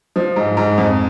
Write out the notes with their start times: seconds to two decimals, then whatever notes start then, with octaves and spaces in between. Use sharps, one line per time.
0.16 F3
0.36 G#2
0.57 G#2
0.78 F2